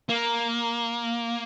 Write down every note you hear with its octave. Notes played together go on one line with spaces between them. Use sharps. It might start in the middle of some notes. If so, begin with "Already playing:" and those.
A#3